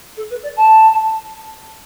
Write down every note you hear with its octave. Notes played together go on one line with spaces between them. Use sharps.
A4
B4
D5
A5